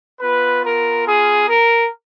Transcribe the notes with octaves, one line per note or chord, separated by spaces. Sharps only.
B3 F4 B4
A#4
G#4
A#4